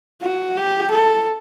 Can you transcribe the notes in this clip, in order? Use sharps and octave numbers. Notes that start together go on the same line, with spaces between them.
F#4
G4
A4